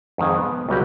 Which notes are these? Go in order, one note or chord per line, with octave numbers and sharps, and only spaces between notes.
F2 G#2 D#3 G#4
B3
C#2 F#3 G3 F#4 G4 G5